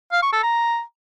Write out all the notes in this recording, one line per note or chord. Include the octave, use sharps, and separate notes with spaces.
F5
C#6
A4
A#5